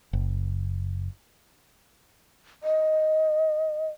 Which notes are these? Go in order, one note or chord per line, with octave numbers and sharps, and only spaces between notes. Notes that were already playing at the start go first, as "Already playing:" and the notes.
F#1
D#5